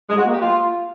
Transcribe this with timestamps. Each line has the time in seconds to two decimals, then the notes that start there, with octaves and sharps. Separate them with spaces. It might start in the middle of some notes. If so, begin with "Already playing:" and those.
0.10 G#3
0.17 F#4
0.25 A#3
0.33 G4
0.40 F4